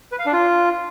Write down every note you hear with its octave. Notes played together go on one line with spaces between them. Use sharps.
B4
F5
D4
F4